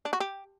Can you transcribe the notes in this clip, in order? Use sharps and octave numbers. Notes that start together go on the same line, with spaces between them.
D4
F#4
G4